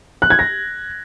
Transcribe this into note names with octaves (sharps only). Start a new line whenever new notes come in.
F#6
G#6
A#6